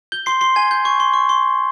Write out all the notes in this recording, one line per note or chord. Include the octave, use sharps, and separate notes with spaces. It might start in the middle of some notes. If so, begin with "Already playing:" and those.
G6 G7
C6 C7
C6 C7
G#5 G#6
G6
C#6
C6
C#6
C6